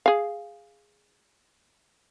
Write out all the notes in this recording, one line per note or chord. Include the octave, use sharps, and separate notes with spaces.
G#4 F5